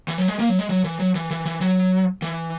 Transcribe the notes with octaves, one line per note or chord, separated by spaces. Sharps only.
E3
F#3
G#3
A#3
F#3
G#3
F#3
E3
F#3
E3
E3
E3
F#3
E3